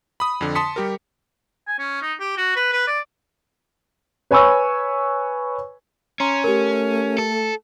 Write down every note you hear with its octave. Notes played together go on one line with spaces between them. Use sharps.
B5 D#6
F2 D3
A5 C6 D#6 B6 C#7
G3 G4 A#4
G#5
C#4
D#4
G4
F#4
B4
B4
D5
B4 C#5 G#5 B5 C#6 E6
C#4 A#5 C6
A3 G4 A#4
A4